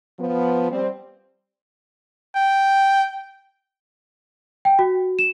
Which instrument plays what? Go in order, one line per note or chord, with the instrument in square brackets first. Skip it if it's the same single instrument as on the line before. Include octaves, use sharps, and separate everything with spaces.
[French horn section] F3 B3
G3 C4
[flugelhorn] G5
[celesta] G5
F#4
E7